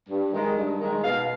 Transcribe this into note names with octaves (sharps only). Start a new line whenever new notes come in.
G2
D#3 G#3
G2
D#3 G#3
B2 F5